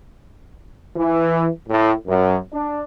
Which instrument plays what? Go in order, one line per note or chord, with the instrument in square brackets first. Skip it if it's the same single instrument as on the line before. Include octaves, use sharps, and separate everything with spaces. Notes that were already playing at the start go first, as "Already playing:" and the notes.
[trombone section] E3
A2
F#2
D4